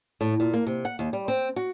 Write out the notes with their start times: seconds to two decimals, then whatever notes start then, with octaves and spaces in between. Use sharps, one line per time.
0.21 A2
0.40 A#2
0.54 A#3
0.67 C3
0.85 F#5
0.99 D#2
1.13 G3
1.28 C4
1.56 F#4